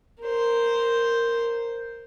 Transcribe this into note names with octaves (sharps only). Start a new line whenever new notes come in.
A#4 C5